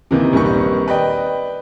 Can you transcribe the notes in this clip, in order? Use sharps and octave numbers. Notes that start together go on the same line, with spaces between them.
C3 D#3 E3 A#3
A#1 D#3 G3 C4 B4 C#6
B4 D5 D#5 G5